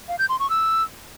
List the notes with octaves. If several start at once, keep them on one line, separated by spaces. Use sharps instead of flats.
F5
G6
C6
C#6
E6